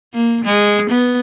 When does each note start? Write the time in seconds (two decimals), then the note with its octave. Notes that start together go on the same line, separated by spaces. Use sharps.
0.14 A#3
0.45 G#3
0.90 B3